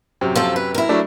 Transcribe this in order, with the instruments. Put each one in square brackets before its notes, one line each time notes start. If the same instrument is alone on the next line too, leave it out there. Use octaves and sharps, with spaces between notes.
[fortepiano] F#2 C3
[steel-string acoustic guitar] F3 C4 A4
B4
E4 A#4
[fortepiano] F#3 A3 D4